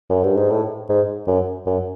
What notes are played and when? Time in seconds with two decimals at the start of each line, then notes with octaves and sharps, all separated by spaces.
0.10 F#2
0.24 G2
0.37 G#2
0.50 A2
0.89 G#2
1.27 F#2
1.66 F#2